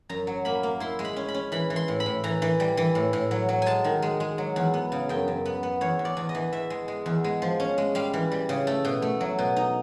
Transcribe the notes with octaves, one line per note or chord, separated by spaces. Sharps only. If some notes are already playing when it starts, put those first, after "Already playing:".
F#2 A#5
F#3
A#3 B5
A#3
E4 C6
G#3
B5
C#4
B5
C#4
E3 B5
E3
C6
A2
B5
A2
E3 A#5
E3
G3
E3
A2
A2
F#3
F#3
G#3 G#5 A5
D#3
G#3
G#3
F#3
E2
B3
C#3
F#2 G5
F#2
B3
B3
E2 C#5
E2
D5
E2
D#5
E3
E2 E5
G#3
G#3
E2
G#3
F3
C#4
G#3
G3 F5
E3
G3
C#3
A3
B2
A3
F#3
B2
D#4